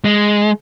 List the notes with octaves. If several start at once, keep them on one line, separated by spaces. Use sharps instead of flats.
G#3